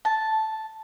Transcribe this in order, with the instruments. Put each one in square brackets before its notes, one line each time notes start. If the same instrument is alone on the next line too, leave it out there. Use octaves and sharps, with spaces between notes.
[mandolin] A5